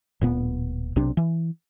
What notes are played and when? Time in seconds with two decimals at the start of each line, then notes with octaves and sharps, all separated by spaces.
0.21 D1 A#2 B3
0.96 B1 C3 D4
1.17 E3